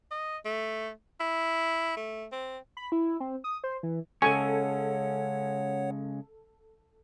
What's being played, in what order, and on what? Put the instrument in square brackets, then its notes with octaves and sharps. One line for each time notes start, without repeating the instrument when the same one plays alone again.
[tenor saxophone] D#5
A3
E4
A3
C4
[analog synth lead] B5
E4
C4
D#6
C5
E3
[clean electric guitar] C#3 G#3 C#4 [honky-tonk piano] A4 [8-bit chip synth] C#5 F#5 [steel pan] G#5 C#6